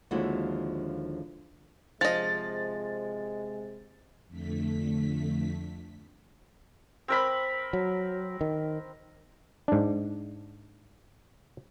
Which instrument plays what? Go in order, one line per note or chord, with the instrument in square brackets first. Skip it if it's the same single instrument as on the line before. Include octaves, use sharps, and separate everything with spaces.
[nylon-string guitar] D#2 D3 F3 G#3 E4 F#4
[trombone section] C3 G#3 [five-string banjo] F3 D#5 [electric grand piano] A6
[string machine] F2 D3 A3 B6
[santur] C4 A#4 B5
[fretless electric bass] F#3
D#3
[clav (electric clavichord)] G#2 D4